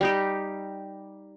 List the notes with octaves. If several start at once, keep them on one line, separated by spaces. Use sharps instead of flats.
G3 D#4 G4